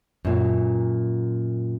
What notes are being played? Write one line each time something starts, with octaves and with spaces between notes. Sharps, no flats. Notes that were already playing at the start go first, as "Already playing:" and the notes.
F#2 A#2